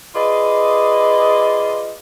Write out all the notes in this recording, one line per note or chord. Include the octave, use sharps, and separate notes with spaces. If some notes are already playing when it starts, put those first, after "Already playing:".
F4 G#4 B4 D5 D#5